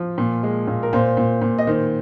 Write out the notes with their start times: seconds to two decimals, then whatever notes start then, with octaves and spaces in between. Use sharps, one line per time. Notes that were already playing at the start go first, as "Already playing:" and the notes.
Already playing: F3
0.18 A#2
0.43 G#3
0.67 A#2
0.83 A#4
0.93 A#2 C5
1.17 A#2
1.42 A#2
1.58 D#5
1.67 D#3 C5